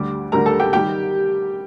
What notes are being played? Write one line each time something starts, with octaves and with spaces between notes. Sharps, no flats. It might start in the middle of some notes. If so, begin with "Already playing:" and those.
Already playing: D2 D3 G3 D6
D2 D3 G3 A#4 A#5
A4 A5
G4 G5
D#3 G3 G4 G5